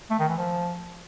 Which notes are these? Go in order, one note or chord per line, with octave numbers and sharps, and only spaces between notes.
A3
D#3
E3
F3